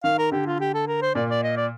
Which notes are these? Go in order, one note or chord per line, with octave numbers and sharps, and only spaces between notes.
D#3 F5
A#4
D3 G4
F4
G4
A4
A#4
C5
A#2 D5
D5
D#5
D5